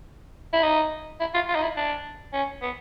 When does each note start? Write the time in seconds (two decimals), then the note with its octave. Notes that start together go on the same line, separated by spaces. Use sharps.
0.53 E4
0.63 D#4
1.20 E4
1.34 F4
1.49 F4
1.56 D#4
1.63 E4
1.77 D4
2.33 C#4
2.62 B3